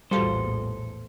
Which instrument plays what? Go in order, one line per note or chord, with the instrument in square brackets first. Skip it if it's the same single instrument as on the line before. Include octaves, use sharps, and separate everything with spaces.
[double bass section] A#1 E2 A2 [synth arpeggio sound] G3 F4 F#4 [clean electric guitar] A4 C5